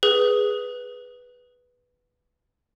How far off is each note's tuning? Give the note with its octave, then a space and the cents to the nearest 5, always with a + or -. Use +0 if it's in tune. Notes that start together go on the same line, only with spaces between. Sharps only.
G#4 +0 B4 +0